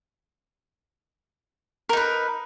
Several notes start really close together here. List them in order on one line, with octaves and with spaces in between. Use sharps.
A#4 D#4 B4